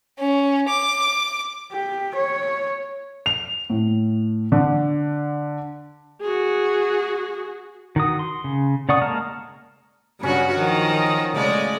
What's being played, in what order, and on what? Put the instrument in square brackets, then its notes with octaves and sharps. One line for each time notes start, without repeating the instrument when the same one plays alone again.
[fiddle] C#4
D6
[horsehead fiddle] G4
C#5
[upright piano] F7
A2
D3
[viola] F#4 G#4
[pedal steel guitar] D#3 F#4 D#6
C6
C#3
C#3 D5 F#5 C#6 D#6
G#3 A#3 A5 A#5 F6
[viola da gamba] G2 C#3 F#4 [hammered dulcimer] F#3 C#4 B5
[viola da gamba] D#3 F3
[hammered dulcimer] D#5
[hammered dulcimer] A2 F5 A5 [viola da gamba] C#3 G#3 D5